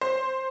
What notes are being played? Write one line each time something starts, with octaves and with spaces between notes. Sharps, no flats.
C5